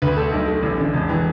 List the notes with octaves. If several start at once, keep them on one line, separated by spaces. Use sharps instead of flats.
D2 B4
A3 A4
B1
A3
A1
D3
E1
E3